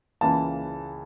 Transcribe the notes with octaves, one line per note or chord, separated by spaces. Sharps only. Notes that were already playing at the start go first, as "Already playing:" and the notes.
C#2 C#3 E3 A#3 A5